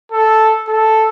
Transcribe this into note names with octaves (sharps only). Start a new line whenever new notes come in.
A4
A4